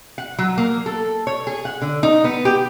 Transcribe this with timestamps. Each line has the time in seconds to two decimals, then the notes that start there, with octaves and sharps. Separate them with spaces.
0.18 F#5
0.39 F#3
0.58 A#3
0.86 A4
1.27 C#5
1.47 G#4
1.65 F#5
1.82 D3
2.03 D#4
2.24 B3
2.45 G4